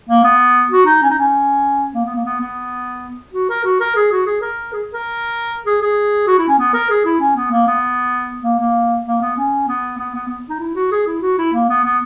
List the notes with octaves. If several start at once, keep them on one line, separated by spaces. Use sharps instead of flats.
A#3
B3
F#4
D#4
C#4
D#4
C#4
A#3
B3
A#3
B3
B3
F#4
A#4
F#4
A#4
G#4
F#4
G#4
A#4
G#4
A#4
G#4
G#4
F#4
E4
C#4
B3
A#4
G#4
E4
C#4
B3
A#3
B3
A#3
A#3
A#3
B3
C#4
B3
B3
B3
B3
D#4
E4
F#4
G#4
E4
F#4
E4
A#3
B3
B3